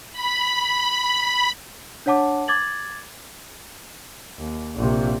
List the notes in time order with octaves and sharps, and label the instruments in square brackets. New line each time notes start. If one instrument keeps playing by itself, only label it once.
[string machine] B5
[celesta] D4 C#5 F#5 A5 D6
D6 G#6 A6 F#7
[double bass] D#2
A#1 C3